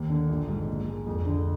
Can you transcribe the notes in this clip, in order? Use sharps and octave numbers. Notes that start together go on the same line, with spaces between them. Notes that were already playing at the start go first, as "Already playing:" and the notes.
Already playing: D#2
D3
A#1
G#2
A#2
G#3
F2
D3